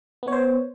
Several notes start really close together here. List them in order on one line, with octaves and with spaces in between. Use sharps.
B3 C#5 C5